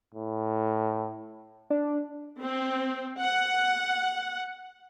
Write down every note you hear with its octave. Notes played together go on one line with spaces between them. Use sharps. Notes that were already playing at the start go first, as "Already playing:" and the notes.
A2
D4
C4
F#5